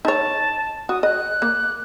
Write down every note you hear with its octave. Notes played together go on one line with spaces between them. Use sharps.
D#4 C#5 A5
F#4 D#6
D#5 F#6
A#3